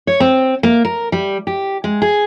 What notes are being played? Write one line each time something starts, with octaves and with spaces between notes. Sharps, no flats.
C#5
C4
A#3
A#4
G3
G4
G#3
G#4